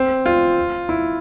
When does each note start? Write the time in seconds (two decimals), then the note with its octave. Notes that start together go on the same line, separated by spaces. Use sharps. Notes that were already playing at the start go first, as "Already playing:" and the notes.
Already playing: C4
0.26 F4
0.89 E4